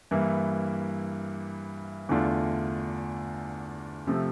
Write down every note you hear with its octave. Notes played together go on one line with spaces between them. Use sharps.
G2 E3 A#3 E4
E2 D3 A3 D4 F4
C3 F3 A3 C4